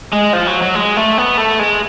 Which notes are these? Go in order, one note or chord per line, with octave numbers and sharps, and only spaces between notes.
G#3
F3
F#3
F#3
G#3
A3
B3
A3
G#3